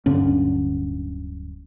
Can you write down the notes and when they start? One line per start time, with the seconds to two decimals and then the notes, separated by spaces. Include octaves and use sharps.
0.06 D1 G2 D3 C#4